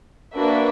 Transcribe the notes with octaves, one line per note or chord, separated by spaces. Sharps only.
A#3 D4 F#4 B4 E5